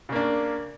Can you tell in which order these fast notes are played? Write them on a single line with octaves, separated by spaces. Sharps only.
C#3 A#3 D4